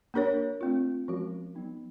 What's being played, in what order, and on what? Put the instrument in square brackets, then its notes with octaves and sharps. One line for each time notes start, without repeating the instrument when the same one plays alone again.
[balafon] A#3 D4 G4 A#4 C#5
A3 C4 F4
F3 G#3 C#4 F#4 A#4
F#3 B3 D#4